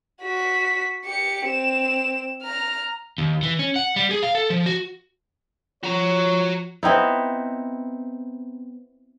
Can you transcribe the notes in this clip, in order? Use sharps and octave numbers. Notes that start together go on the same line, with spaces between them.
F#4 B6
G4 C#7
C4 E7
A#5 F6
D#2
E3
C#4
F#5
G3
G#4
F5
A4
F3
F#4
F3 F#4 C#5 A#5
B3 C4 D#4 E4